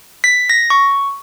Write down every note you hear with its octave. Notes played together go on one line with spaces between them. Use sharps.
B6
A#6
C#6